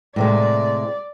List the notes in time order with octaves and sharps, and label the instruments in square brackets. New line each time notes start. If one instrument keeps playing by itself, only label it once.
[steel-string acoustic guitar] A2 C3 G#3 [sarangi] D5